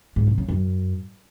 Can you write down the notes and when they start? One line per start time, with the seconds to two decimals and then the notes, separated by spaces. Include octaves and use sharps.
0.16 G#2
0.27 C3
0.38 C#3
0.49 F#2